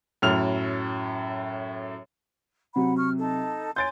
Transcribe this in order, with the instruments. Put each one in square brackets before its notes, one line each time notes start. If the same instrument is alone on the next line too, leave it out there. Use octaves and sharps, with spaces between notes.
[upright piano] F#2 A2 F6 F7
[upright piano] C3 F#3 C4 [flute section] F#5 B5
[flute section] C#6 F6
D#4 A4 A5
[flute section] C#5 G#5 C6 [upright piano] G6 A6 D7